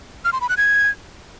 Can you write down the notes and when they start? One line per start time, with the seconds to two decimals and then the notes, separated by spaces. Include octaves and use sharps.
0.25 F6
0.33 C6
0.41 B5
0.49 F#6
0.57 G#6